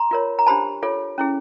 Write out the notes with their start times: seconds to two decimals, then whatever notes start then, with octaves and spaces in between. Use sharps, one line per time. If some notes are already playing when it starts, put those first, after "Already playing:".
Already playing: A#5 C6
0.11 F4 A#4 C#5
0.39 A#5
0.47 D4 G4 C5 A5 B5
0.83 F4 A4 C#5
1.18 C#4 E4 G#4